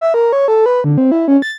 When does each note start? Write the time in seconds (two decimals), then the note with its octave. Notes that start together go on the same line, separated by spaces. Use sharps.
0.01 E5
0.14 A#4
0.33 C#5
0.48 A4
0.66 B4
0.84 D3
0.98 C4
1.12 E4
1.28 C#4
1.42 A6